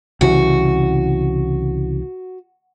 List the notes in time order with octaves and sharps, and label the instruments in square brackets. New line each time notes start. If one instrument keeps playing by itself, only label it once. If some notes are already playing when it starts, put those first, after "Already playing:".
[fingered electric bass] C2 C#3 E3 [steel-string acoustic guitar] F#4